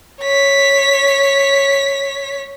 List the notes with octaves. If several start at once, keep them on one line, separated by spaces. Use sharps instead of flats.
C#5 B6